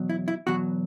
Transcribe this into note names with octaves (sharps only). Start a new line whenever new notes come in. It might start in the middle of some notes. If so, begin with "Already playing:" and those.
Already playing: E2 B2 F#3
E4
E4
E2 B2 F#3 F#4